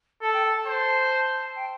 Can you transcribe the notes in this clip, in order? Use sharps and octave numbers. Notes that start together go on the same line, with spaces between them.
A4 A5
G5
A5
A5
C5
G5